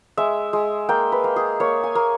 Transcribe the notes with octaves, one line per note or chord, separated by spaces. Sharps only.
G#3 E5
G#3
A#3 G5
B4
A#3
G#4
A#3 C#5
G#5
A#3